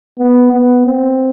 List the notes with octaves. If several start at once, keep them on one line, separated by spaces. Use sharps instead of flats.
B3
B3
C4